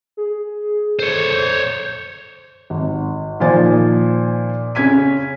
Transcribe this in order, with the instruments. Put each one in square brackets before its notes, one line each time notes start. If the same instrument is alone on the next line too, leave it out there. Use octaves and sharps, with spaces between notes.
[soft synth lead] G#4
[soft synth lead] A4 [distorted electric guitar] C5 C#5
[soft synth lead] G6
[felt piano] G#1
A#2 D#3 F3 C5 G#5 A6
C#3 C#4 C#5 G#6 B6 D#7